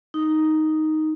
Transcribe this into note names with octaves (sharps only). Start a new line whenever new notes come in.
D#4